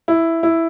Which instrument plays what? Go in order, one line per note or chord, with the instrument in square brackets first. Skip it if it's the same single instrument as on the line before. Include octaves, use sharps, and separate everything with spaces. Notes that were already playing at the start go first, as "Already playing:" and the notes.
[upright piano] E4
E4